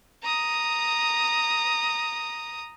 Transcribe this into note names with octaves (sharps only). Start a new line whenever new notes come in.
A#5 D#6